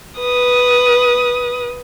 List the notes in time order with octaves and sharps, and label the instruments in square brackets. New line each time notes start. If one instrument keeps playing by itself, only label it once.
[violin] B4 D#6